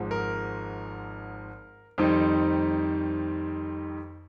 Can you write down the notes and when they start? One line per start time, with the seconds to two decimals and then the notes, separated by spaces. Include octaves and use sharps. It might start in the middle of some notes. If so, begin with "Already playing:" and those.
Already playing: G#1 G#2 F3 G#3
0.11 A#4
1.98 F2 D#3 G3 C4 D#4